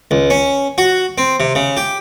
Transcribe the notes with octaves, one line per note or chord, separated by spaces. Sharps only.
C#2
C#4
F#4
C4
C3
C#3
G4